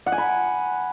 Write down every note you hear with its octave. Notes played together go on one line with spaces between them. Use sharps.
F#5
G#5
B5